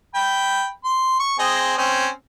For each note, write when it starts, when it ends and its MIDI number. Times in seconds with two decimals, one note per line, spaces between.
0.15 0.68 79
0.15 0.68 83
0.84 1.17 84
1.20 1.35 85
1.39 1.75 60
1.39 1.75 68
1.39 1.75 75
1.78 2.08 60
1.78 2.08 61